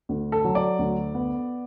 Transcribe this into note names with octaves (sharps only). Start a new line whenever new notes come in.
D2
A4
F#3
D5
D2
B3